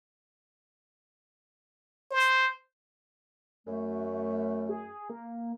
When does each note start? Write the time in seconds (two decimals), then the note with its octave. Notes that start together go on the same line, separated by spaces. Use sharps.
2.11 C5
3.67 F#2 A3
4.69 G#4
5.10 A#3